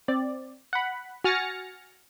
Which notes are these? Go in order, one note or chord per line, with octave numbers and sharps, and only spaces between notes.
C4 D5
F#5 B5
F#4 G#5 F6 A6 A#6 C#7